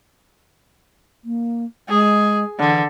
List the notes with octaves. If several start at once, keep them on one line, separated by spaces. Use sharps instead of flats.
A#3
G#3 G#4
D3 E3